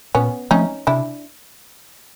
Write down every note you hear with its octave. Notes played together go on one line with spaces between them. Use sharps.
A#2 B3 C#4
F3 A3 C4 C#4 D#4
C3 D4 E4